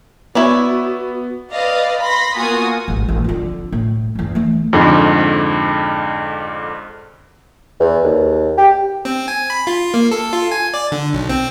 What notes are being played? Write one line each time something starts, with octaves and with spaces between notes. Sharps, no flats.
B3 E4 F#4 C#5 D5
B4 D5 D#5 F5
B5 C6 A#6
A#3 B3 F4 F#4 G#5 D#6
A1 G#2
A1
F2 D3
A2
E2 G2
E3 A3
F2 G#2 D3
E2
D#2
G4
C4
G#5
B5
F4
A#3
A4
F4
G#5
D5
D3
B1
C4